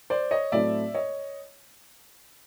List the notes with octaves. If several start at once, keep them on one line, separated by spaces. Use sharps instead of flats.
C5 D5
C#5 D#5
A2 F#3 A3 C4 E4 D5 E5
C#5 D#5